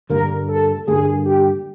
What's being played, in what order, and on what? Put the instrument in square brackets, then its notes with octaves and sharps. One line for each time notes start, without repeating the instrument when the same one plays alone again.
[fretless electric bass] G2 D3 G3 A#3 [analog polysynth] A#4
[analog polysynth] A4
[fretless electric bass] G2 D3 G3 A#3 [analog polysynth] G#4
[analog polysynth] G4